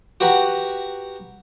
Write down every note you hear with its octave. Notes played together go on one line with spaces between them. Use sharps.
F#4 G4 B4 F#5 A#5